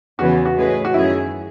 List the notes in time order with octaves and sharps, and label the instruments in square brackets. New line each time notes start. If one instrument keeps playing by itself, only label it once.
[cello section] E2 C#3 E3 B3 [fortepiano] F#4
[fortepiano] F#4
[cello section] A2 G#3 C#4 G#4 B4
[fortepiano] F#4
[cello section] F#2 D#3 F#3 C#4 G#4 [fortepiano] E4